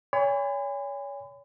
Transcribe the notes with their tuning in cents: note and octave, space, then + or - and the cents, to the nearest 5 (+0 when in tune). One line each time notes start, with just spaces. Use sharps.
C#5 +30 G#5 -35 B5 +40